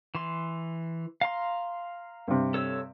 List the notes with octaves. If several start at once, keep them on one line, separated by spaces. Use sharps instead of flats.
E3 C6
F5 A#5 C6
G2 C3
A4 C#5 E6